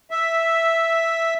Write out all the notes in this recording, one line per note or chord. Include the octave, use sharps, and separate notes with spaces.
E5